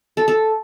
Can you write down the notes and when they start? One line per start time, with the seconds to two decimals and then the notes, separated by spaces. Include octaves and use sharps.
0.17 A4
0.28 A4